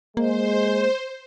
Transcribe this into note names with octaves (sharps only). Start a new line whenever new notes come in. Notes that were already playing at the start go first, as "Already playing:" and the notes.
G#3 A#3 C5